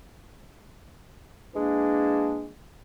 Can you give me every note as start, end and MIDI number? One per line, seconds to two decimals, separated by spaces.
1.54 2.49 52
1.54 2.49 56
1.54 2.49 58
1.54 2.49 62